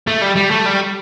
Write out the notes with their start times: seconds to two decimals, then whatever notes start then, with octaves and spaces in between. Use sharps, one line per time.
0.07 A3
0.21 G3
0.36 G3
0.51 A3
0.66 G3